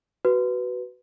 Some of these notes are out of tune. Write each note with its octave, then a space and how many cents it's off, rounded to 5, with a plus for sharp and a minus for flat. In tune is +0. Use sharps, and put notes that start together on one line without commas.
F#4 +20 B4 +0